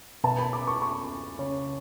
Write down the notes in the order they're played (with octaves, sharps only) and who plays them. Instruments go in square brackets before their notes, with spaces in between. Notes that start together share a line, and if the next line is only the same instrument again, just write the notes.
[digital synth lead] B2 [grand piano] A5
[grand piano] B5
D6
C#6
C#6
[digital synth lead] C#3